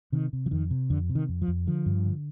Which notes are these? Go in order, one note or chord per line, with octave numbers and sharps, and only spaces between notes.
C3 D#3
C3
F3
F2 D#3
C3
F2 D3
C3
D#3
F2
F3
F2
D3 F3
G2
D3